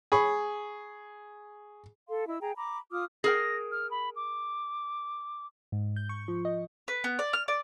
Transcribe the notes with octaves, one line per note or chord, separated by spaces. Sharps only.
G#4 B5 C#6
A4 F5 C6
E4 D#5 E6
G#4 G5 A#5
A#5 B5 D6
F4 D6 D#6 F6
G#4 A#4 G5 A#6
F6
B5
D6
G#2
G6
C#6
F3
D#5
B4
B3
D5
F6
D5